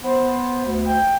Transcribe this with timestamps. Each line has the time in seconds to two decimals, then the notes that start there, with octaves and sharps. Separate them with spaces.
0.03 B3 C5
0.66 D2
0.85 G5